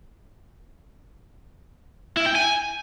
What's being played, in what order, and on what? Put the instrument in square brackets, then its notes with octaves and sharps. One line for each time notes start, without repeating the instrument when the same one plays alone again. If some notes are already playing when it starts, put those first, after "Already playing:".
[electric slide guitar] E4
G5
G#5